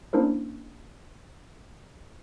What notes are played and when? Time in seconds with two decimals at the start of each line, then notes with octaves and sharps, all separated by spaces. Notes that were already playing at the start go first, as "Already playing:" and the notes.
0.13 A#3 C#4 D4 E4 A#4 C5